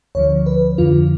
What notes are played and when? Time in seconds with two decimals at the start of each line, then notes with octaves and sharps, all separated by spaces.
0.15 D2 D3 F3 C#5
0.46 B4
0.78 F2 D3 F3 F4